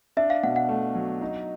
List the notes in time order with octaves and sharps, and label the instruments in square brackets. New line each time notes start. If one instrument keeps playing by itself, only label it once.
[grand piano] D4 [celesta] E5
[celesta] F5
[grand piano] B2 [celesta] F#5
[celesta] F#5
[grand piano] A3
F#3
D#4